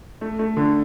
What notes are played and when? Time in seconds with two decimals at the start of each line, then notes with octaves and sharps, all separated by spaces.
0.21 A3
0.39 A3
0.57 D3